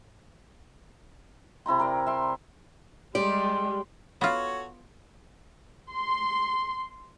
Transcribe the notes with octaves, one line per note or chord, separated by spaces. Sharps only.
C3 E4 A#5 C6
A#4 D5
E5 C6
G3 G#3 G4 D5 C6
B3 F4 F#4 A4 C#5
C6